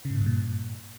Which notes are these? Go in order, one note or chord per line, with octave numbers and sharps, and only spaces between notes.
C#3
G#2
A#2
G2
A#2